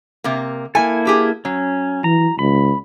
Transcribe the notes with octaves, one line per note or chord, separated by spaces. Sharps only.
C3 A#3
A#3 E4 A4 G#5
D4 G4 G#4
F#3 C#4
E3 A#5
C#2 B5